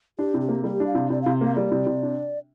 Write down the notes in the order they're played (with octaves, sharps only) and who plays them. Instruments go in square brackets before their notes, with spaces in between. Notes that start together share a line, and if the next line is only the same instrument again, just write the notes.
[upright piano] D4 [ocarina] G4
[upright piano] C3
[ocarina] G4
[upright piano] A#3
[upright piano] G3 [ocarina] G4
[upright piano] D4
[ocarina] F5
[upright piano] C3
[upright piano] C3 [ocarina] D5
[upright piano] C3 [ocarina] F5
[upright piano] A#3 [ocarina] F5
[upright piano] G3 [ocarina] D5
[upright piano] C3
C3
D4